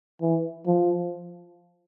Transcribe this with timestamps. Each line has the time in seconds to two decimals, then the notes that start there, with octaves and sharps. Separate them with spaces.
0.21 E3
0.67 F3